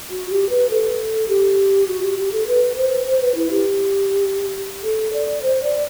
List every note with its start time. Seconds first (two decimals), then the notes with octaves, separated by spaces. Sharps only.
0.10 F#4
0.30 G4
0.50 B4
0.70 A4
1.29 G4
1.88 F#4
2.03 G4
2.18 G4
2.32 A4
2.47 B4
2.76 C5
3.06 C5
3.21 B4
3.35 E4
3.51 G4
4.83 A4
5.13 D5
5.43 C5
5.63 D5